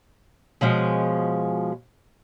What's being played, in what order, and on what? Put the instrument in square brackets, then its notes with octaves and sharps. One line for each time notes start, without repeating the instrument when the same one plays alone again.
[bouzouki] B2 F3 G#3 C#4